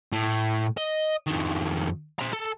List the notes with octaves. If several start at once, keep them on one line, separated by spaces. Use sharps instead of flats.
A2
D#5
F2 D#3
C5 A#5
A4